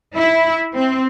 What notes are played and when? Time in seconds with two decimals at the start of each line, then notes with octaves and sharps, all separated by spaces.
0.16 E4
0.75 C4